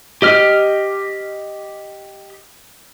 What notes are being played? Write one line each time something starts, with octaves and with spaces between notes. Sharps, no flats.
G4 D#5 F6